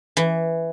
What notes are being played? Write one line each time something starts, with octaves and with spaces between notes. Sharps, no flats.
E3